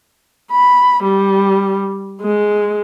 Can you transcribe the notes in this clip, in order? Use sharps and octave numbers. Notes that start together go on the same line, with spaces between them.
B5
G3
G#3